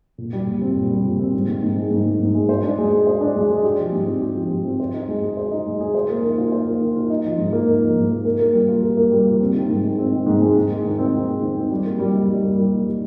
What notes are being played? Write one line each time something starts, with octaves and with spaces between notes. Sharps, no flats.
A#2
G3
A#2
C4
A#2
G3
A#2
C4
G#2
D#3
G#2
G#3
G#2
D#3
G#2
G#3
C5
D4
G#3
G#4
C5
D4
G#3
G#4
G4
F3
G#2
C4
G4
F3
G#2
C4
C5
D#4
G#3
G#4
C5
D#4
G#3
G#4
C5
A#3
D#3
F4
C5
A#3
D#3
F4
D#4
F3
G#2
A#3
D#4
F3
G#2
A#3
A#4
A#3
G3
F4
A#4
A#3
G3
F4
C4
D#3
G#2
G#3
C4
D#3
G#2
G#3
D#3
G#3
D#3
C4
D#3
G#3
D#3
C4
G3
A#3
G3
D#4
G3
A#3
G3
D#4